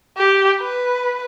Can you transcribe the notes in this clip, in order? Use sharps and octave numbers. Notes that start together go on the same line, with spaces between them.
G4
B4